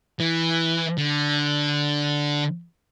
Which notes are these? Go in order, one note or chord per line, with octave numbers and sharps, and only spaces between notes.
E3
D3